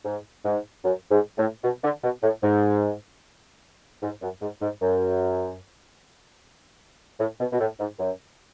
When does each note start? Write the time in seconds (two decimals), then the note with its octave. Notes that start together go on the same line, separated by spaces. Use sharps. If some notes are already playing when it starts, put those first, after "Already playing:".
0.05 G#2
0.45 G#2
0.84 F#2
1.11 G#2
1.38 A2
1.64 B2
1.84 D3
2.04 B2
2.23 A2
2.43 G#2
4.03 G#2
4.22 F#2
4.42 G#2
4.62 G#2
4.82 F#2
7.20 A2
7.40 B2
7.53 B2
7.60 A2
7.80 G#2
7.99 F#2